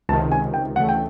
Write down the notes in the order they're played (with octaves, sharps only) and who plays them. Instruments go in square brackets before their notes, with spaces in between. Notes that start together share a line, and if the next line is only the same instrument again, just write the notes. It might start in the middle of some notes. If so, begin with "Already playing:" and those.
[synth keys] C#2 C3 D#3 [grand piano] A5
[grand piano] G#5
G5
[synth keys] D2 C#3 E3 A3 [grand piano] F#5
[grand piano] G5